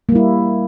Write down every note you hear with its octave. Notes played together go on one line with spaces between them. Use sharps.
G3 A#3 E4